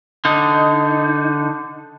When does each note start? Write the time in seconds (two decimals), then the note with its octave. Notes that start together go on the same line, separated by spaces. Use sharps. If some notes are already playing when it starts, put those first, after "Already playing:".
0.25 D3 D#4